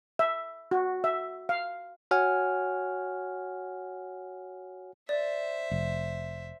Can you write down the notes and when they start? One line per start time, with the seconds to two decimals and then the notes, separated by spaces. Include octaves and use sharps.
0.19 E5
0.71 F#4
1.04 E5
1.49 F5
2.11 F#4 C#5 F#5 G#5 F6
5.09 C5 D5 E5
5.71 F1